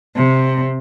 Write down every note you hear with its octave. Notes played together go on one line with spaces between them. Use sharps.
C3